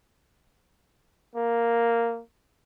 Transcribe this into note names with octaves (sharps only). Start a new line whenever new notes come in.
A#3